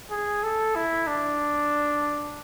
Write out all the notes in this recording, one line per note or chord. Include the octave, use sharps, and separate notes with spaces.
G#4
A4
E4
D4